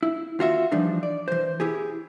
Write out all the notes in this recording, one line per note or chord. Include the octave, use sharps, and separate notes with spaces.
E4
D#2 F4 F#4 E5
E3 F3 G3 D4 D#4
D5
E3 C5
E4 G4 G#4